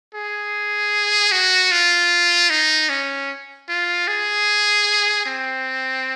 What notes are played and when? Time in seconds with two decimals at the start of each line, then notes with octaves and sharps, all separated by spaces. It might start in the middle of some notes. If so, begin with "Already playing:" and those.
0.14 G#4
1.32 F#4
1.72 F4
2.50 D#4
2.89 C#4
3.69 F4
4.07 G#4
5.26 C4